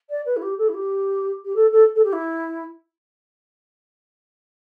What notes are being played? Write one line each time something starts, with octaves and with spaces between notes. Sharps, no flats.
D5
B4
E4
G4
A4
E4
G4
G4
A4
A4
A4
G4
E4